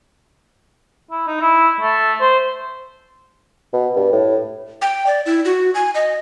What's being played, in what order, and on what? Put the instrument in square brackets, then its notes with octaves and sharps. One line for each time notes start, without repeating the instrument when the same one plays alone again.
[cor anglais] E4
D#4
E4
A3
C5
[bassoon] B2
G2
A2
[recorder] G5
D5
E4
F#4
G#5
D#5